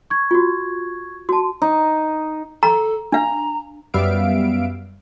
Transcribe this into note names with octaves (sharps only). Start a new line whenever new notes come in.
C#6 G#6
F4 F#4
F#4 A5 C6
D#4
A4 A#5
D4 F5 A#5
F#2 G3 B3 E5 F5 D7